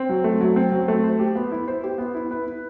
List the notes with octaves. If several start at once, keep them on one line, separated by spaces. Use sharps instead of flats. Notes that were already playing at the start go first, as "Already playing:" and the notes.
Already playing: C4
F#3
A3
F#3
C4
F#3
A3
C5
G4
B3
E4
C5
G4
B3
E4
B4
E4